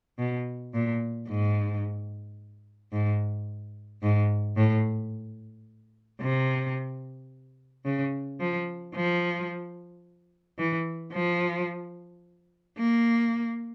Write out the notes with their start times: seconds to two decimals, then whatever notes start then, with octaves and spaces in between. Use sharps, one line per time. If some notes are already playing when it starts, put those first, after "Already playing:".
0.19 B2
0.74 A#2
1.29 G#2
2.92 G#2
4.02 G#2
4.56 A2
6.21 C3
7.85 C#3
8.40 F3
8.95 F3
10.59 E3
11.13 F3
12.78 A#3